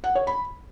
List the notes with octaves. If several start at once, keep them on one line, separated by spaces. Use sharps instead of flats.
F#5
C#5
B5